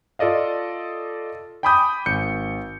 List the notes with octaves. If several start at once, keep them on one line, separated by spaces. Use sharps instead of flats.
F4 A4 D5 D#5 F5
G5 G#5 B5 D6 D#6 G6
G#1 G6 C#7